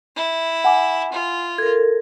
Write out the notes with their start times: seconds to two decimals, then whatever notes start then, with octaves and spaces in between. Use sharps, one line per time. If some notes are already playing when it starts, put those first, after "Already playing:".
0.16 E4
0.64 F#5 G#5 D6
1.13 F4
1.58 A4 A#4 G#6